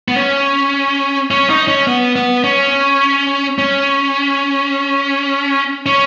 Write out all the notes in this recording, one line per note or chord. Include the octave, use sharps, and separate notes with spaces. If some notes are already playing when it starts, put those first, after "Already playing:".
B3
C#4
C#4
D#4
C#4
B3
B3
C#4
C#4
C#4